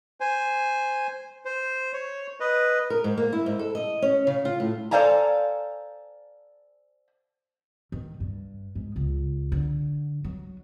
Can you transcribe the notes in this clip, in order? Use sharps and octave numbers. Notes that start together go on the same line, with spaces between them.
C5 G#5
C5
C#5
B4 D#5
A#4
G#2
A#3
E4
G#2
A4
D#5
C#4
C#3
F4
A2
A4 C5 D5 F5 G#5 A#5
D#3
G2
G#2
C#2
D3
F#3